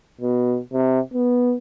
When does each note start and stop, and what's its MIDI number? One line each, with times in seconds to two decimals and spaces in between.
0.21 0.59 47
0.73 0.99 48
1.14 1.55 59